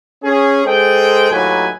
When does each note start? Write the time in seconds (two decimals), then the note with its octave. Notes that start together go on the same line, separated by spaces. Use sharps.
0.24 C#4 G#4
0.66 G#3 G#4 A4 C5 G5
1.31 D#2 A2 D#3 F#3 B4 G#5